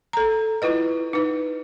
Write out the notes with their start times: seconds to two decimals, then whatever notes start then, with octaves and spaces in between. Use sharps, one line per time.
0.13 A4 A#5
0.62 E4 F4 B4 D#5
1.13 D#4 B4